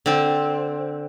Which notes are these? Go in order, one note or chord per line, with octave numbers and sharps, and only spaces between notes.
D3 C4